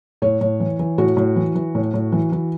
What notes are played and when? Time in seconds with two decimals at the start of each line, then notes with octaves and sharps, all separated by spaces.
0.22 A2 C#5
0.41 A2
0.60 E3
0.79 E3
0.98 A2 F#4
1.17 A2
1.36 E3
1.55 E3
1.75 A2
1.94 A2
2.12 E3
2.32 E3